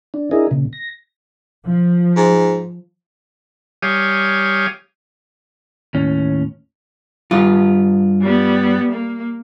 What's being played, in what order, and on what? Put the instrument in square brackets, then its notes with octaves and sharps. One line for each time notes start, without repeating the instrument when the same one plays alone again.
[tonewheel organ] D4
D4 E4 G#4 A#4 D#5
A#2 C#3
A#6
[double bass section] F3
[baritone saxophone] G#2
[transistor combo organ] G3 G4 C#5 F5 G#5 D#6
[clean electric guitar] D#2 A2 C#4
[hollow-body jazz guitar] G2 F4
[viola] G3 B3
A#3